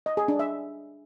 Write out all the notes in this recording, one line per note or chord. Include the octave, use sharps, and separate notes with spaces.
D#5
G#4
D4
E5